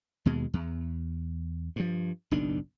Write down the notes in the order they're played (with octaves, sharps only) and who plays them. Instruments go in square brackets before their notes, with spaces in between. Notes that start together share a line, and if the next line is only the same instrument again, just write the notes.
[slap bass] D#2 B2 G#3
E2
G2 F3
F#1 B1 D#3 D4